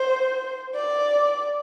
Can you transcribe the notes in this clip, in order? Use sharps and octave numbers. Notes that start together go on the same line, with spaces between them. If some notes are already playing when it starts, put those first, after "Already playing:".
Already playing: C5
D5